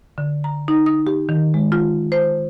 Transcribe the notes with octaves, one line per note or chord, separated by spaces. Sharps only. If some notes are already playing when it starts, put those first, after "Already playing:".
D3
A#5
D#4
D#6
G4
D#3
G#3
F4
C5